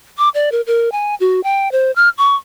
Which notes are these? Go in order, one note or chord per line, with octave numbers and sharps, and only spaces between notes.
D6
D5
A#4
A#4
G#5
F#4
G5
C5
F6
C#6